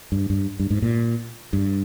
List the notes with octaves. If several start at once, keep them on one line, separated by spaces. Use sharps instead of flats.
G2
G2
G2
G#2
A#2
G2